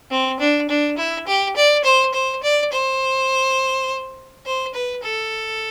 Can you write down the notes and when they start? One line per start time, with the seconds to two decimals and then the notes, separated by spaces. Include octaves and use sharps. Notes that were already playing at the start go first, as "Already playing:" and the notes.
0.11 C4
0.40 D4
0.69 D4
0.97 E4
1.27 G4
1.56 D5
1.84 C5
2.14 C5
2.43 D5
2.72 C5
4.46 C5
4.74 B4
5.03 A4